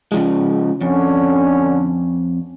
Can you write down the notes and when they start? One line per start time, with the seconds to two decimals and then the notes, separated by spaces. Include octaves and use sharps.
0.12 C#3 F3 G#3
0.81 F2 D3 C#4